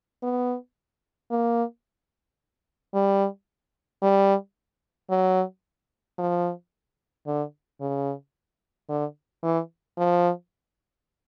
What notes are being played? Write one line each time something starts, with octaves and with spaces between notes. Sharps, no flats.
B3
A#3
G3
G3
F#3
F3
D3
C#3
D3
E3
F3